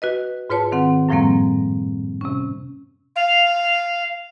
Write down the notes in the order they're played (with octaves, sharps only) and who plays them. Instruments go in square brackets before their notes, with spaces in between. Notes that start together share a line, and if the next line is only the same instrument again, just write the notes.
[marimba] F#4 B4 D#5
G#2 F4 B4 C#5 A5
D#3 C4 F#5
F#2 A2 F3 G3 A#3 C4
C3 C#4
[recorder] F5